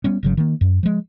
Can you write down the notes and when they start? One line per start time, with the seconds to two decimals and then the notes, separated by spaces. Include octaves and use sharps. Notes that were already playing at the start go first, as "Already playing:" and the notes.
0.04 G3 B3 C#4
0.23 G1 C#3 F#3
0.37 D#3 A#3
0.61 F#2
0.83 F3 G#3